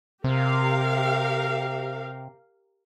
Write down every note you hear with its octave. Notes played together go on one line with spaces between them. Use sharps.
C3 G4 A#4 F5